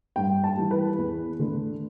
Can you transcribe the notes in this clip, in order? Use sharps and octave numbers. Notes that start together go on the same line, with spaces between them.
G2 G5
A5
E3 G3
B4
E2
D3 A3